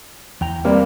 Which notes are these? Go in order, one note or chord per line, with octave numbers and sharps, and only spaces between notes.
E2 G5 A#5
C3 G3 A#3